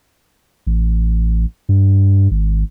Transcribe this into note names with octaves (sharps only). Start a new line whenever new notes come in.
A1
G2
G#1